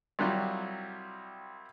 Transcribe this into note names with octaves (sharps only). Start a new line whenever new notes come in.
C2 F#3 G3 F4